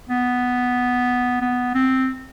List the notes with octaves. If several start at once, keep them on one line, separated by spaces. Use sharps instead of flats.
B3
B3
C4